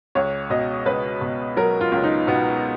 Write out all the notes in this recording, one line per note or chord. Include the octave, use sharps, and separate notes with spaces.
C#2 C#5
B2 D#5
C#2 B4
B2
F#3 A#4
F4
C#2
D#4
B2 B3